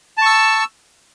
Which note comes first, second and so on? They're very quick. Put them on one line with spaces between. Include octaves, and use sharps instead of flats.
A5 C#6 E6